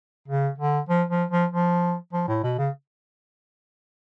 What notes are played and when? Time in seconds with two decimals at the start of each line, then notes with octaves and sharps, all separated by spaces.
0.28 C#3
0.58 D3
0.89 F3
1.10 F3
1.31 F3
1.52 F3
2.13 F3
2.28 A2
2.43 B2
2.59 C#3